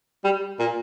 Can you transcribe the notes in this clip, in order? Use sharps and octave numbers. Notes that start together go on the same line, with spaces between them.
G3
A#2